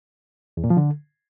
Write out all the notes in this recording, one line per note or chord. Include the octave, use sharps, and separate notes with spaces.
E2
A#2
F3
D3